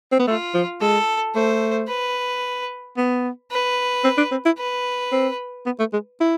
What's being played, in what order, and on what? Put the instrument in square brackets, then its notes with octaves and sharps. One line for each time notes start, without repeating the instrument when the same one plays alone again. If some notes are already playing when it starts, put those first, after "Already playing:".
[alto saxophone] C4
B3
[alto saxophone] A3 [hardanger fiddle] F4
[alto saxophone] F3
[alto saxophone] G#3 [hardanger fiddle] A4
[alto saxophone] A3 [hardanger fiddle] C5
[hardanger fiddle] B4
[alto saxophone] B3
[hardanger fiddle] B4
[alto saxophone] C4
D4
C4
E4
[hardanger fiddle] B4
[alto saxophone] C4
B3
A3
G#3
E4